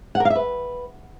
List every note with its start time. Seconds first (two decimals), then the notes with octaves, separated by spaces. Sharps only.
0.15 F#5
0.20 A#4
0.25 F5
0.30 E5
0.35 B4